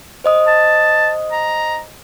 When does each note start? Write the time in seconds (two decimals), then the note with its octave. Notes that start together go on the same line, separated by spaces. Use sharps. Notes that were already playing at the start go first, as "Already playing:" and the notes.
0.24 C5 D#5 D#6
0.47 A5
1.32 A#5